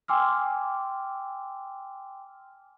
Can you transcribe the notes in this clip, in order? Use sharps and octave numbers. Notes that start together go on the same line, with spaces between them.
G5 G#5 C6 D6 E6 F6